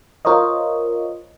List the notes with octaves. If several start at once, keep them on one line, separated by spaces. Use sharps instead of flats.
F4 A#4 C5 C#5 D#5